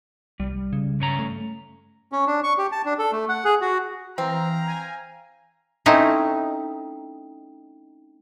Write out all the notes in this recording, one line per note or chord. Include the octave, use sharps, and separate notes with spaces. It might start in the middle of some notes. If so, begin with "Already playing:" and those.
C2 G3
C#3
G2 C#4 A#5
A3
C#4
D4
C#6
G4
A5
D4
A4
A3
F#5
G#4
F#4
E3 C4 F5 G5 A#5
G#5
A3 C4 C#4 D#4 E4